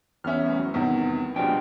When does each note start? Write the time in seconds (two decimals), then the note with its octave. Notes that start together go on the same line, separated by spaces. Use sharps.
0.24 E2 B3 C#4 E5 F6
0.42 C2 F#2 A2
0.59 F#3
0.74 E2 C3 D#3 B3
1.36 B2 F3 G3 G#3 D4 F4 G5